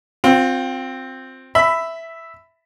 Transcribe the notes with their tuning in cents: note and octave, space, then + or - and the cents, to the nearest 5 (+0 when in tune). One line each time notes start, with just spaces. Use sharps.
C4 +0 F4 +35
E5 +0 B5 +15